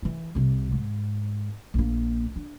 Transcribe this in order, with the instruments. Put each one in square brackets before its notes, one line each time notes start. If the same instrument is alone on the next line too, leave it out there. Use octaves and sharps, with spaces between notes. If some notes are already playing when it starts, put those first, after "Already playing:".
[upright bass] E3 E4
C2 C3
G#2
A#1 A#3
D4